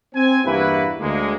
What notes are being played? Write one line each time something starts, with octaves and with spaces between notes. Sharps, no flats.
C4 G#5
E2 G2 A#3 E4 F#4 B4
D2 G#3 A#3